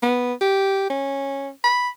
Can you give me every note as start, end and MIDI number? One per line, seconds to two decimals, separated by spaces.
0.02 0.33 59
0.41 0.86 67
0.90 1.50 61
1.64 1.89 83